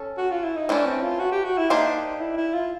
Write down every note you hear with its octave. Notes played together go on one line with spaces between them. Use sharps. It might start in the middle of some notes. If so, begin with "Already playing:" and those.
Already playing: C#4 A4
F#4
F4
E4
D#4
E3 A3 C#4 D4
C4
F4
F#4
G4
F#4
E4
A#3 D4 D#4 G4 C5
E4
E4
F4